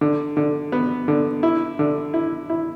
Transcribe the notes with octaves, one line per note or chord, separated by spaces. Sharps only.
D3
D3
B3
D3
E4
D3
E4
E4